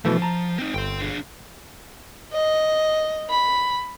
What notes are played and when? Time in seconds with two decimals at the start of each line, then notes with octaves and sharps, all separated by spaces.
0.05 B2 E3 F3 A3
0.22 A5 A#5
0.59 C4 D#4
0.74 G1 G5 C6
1.02 D4 G#4
2.32 D#5
3.30 B5